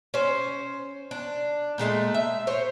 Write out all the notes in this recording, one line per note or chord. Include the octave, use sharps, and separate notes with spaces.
C#4 C5
D4
A#2 G#3 A3 A5
E5
C5 C#5